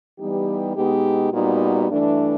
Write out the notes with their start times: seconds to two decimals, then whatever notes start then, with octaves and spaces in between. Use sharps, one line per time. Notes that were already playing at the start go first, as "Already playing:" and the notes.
0.19 E3 G3 B3 D#4 G4
0.76 B2 G#3 B3 D#4 G4
1.32 A#2 G3 B3 D#4 F#4
1.90 G2 E3 A3 D4